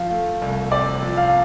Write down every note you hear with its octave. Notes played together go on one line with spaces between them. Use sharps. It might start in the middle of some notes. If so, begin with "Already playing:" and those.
Already playing: F3 F5
A3
C2
C3 D5
F3
F5